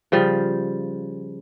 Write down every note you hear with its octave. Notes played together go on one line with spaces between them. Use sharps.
C#3 F3 G3